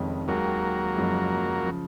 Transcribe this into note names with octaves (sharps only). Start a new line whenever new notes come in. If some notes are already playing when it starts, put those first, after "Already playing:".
Already playing: F1 F2 D#3 G#3 C#4
D#2 D#3 F#3 G#3 A#3
F#1 F#2 F3 G#3
C#3 F3